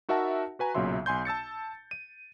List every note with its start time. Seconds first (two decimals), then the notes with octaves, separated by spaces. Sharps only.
0.09 D#4 F#4 A#4 E5 F#5 A5
0.59 F#4 B4 G#5 A#5
0.75 B1 A#2 C#3 F#3 E5 C6
1.06 B1 G#5 C6 G6
1.25 A5 E6 A6 C#7
1.91 D#7